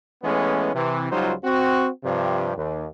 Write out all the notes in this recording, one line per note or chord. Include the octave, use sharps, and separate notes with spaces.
E3 G#3 A3 B3 C#4
C3 E3
C#2 F#3 G3 D#4 F4 C5
C4 F#4
G2 C3 F3
D#2